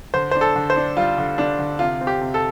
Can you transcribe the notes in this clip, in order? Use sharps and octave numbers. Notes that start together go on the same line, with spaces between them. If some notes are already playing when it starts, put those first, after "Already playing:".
D3 C5
D4 C5
A4
D3
C5
D4
G3 F4
D3
D3 D4
D3
C3 F4
C4
G4
C3
A4